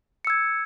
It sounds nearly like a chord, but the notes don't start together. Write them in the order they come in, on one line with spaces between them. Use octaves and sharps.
C#7 E6 G#6